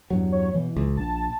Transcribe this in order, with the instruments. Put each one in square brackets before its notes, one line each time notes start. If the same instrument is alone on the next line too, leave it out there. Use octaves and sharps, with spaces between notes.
[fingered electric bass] E2 G2 F#3
[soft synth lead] C#5
[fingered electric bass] B2 [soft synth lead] E3
[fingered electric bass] C#2
[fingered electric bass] A#1 [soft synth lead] A5